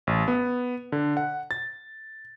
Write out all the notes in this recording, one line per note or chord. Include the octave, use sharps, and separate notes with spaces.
A1
B3
D3
F#5
A6